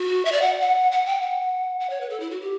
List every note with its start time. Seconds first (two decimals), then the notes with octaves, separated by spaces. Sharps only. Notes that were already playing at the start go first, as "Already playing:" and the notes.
Already playing: F#4
0.25 E5
0.32 D5
0.42 F#5
0.61 F#5
0.92 F#5
1.06 G5
1.22 F#5
1.80 F#5
1.90 C#5
2.01 B4
2.10 A4
2.20 E4
2.31 F#4
2.41 G4